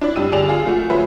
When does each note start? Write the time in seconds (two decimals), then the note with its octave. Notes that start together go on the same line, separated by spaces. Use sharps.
0.01 D4 E4 D5
0.16 G2 D4 G4 E6 D#7
0.32 G1 G4 G#4 D5 E7 F7
0.48 F4 G#4 F5
0.65 F3 A3 F#4
0.90 F3 F#3 G#4 B4 C5 E5